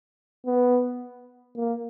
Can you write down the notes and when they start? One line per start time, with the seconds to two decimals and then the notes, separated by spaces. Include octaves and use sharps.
0.46 B3
1.57 A#3